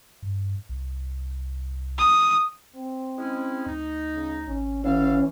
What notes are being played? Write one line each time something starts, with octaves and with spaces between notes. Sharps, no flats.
G2
C2
D#6
C4
G#3 C#4 E4
D2 D#4
C#3
G#1 C#4
E3 C#4 F#4 A4 F5